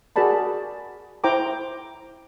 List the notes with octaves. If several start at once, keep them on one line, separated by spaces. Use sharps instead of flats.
F#4 G#4 A#4 D5 A5 B5
E4 C5 G5 A#5 D6